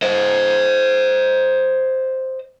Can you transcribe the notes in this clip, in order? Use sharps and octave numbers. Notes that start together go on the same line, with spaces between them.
C5 D#5